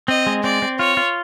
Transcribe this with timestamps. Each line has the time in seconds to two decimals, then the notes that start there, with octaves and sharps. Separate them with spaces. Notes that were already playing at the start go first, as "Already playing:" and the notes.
0.08 C4 D#5
0.27 G#3
0.44 C4 D5
0.62 C4
0.79 F4 C#5
0.97 F4